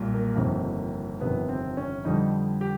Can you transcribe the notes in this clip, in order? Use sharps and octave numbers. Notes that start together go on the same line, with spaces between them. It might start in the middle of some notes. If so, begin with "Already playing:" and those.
Already playing: B1 A#2 G3
A#3
G1 F2 C3 D#3
G1 F2 C3 D#3 B3
C4
C#4
F2 D3 G3 D#4
G4